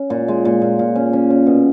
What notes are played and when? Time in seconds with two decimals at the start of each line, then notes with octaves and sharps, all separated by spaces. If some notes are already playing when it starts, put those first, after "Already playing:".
Already playing: C#4
0.10 A#2
0.28 G#3
0.45 A#2
0.62 A#2
0.79 A#2
0.96 C#4
1.13 C#4
1.30 C#4
1.46 B2